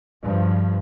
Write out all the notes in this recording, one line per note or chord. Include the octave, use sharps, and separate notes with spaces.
G2 F3